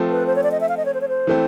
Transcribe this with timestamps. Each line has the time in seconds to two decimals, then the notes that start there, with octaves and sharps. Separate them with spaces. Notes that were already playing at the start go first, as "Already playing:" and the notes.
Already playing: F3 A3 C4
0.10 B4
0.27 C5
0.36 C#5
0.43 D5
0.51 D#5
0.61 E5
0.69 F5
0.77 D#5
0.85 C#5
0.94 C5
1.01 C#5
1.09 C5
1.27 E3 A3 C4